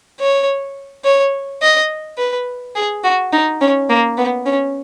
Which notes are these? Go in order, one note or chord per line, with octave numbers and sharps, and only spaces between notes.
C#5
C#5
D#5
B4
G#4
F#4
D#4
C#4
A#3
B3
C#4